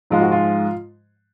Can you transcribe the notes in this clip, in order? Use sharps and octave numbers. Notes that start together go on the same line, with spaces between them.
G#2 F3 G#3 F4
F#4
F4